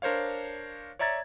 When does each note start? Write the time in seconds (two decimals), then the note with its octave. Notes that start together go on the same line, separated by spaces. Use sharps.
0.02 D4 A#4 C5 C#5 F5
0.99 C#5 D5 E5 A#5 G#6 A6